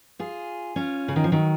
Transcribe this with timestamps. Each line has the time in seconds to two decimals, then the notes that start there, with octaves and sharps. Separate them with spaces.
0.19 F4 G#4
0.76 C#4 F4
1.08 C#3
1.16 D#3
1.24 F3
1.32 D#3 F#3